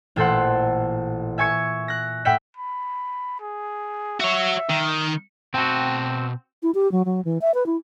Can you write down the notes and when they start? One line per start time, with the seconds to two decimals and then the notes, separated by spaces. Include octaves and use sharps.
0.16 A1 A#2 A4 C5 F#5
1.38 E5 G#5 C#6 G#6 C#7
1.88 F#6 A#6
2.25 A2 E5 F#5 G5 B6 E7
2.57 B5
3.40 G#4
4.20 F#4 C#5 E5
4.70 D#3
5.54 B2 C4 F#4 G5 A5
6.63 E4
6.74 G4
6.92 F#3
7.05 F#3
7.25 E3
7.41 E5
7.54 B4
7.66 E4